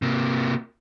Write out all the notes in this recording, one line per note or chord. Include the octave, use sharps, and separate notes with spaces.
C3 A#3